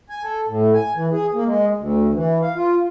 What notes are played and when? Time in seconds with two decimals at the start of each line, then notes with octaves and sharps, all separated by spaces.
0.09 G#5
0.23 A4
0.48 A2
0.74 G#5
0.95 E3
1.12 G#4
1.34 A#3
1.46 G#3
1.77 D2
2.14 E3
2.42 F5
2.56 F4